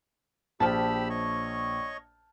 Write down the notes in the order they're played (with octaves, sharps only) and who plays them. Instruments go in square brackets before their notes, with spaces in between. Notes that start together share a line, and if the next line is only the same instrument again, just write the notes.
[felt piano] A#1 C5 F6 [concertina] G4 B5 E6 [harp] A5
[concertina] C#5 D#5 C#6